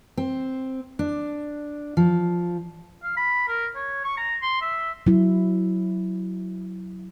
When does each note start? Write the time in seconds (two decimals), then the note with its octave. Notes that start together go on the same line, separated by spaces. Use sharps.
0.17 C4
0.99 D4
1.97 F3
3.03 F5
3.17 B5
3.48 A#4
3.76 C#5
4.05 C#6
4.17 A#5
4.42 C6
4.61 E5
5.07 F#3 E4